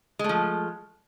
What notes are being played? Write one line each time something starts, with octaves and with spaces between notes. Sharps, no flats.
F3 G#3 A3